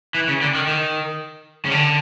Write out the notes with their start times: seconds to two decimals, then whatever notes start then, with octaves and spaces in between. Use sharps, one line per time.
0.15 E3
0.28 C#3
0.42 D3
0.55 D#3
0.67 D#3
1.65 C#3
1.71 D3